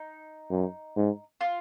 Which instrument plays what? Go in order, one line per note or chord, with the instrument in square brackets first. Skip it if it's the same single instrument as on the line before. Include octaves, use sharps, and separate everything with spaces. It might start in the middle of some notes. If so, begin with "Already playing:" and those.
Already playing: [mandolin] D#4
[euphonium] F#2
G#2
[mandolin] F4